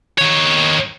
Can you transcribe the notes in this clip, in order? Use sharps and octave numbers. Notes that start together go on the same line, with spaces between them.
D#3 C#5